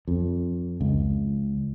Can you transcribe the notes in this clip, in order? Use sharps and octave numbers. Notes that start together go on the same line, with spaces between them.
F2
C#2